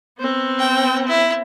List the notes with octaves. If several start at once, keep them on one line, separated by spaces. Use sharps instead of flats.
B3 C4
G5
E4